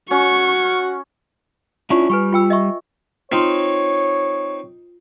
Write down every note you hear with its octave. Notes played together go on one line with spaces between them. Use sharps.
C#4 F#4 C#6
C#4 D4 E4 F4 C#6
G3 B4 G#5 C#6
F4 G5 E6
D#5 E5 C#6
C4 D#4 F4 C#5 C6